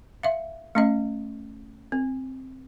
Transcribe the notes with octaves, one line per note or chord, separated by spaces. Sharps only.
E5 F5
A3 C#4 D#5
C4